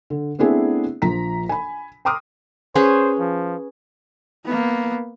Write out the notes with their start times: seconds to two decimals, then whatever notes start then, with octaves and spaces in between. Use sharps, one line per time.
0.10 D3
0.39 A3 B3 C4 D4 E4 G#4
1.02 A#1 F3 A#5 B6
1.49 G#5 B5
2.05 G5 A#5 C6 D6 D#6 F6
2.75 C#4 G#4 B4 C5
3.19 F3
4.45 A#3 B3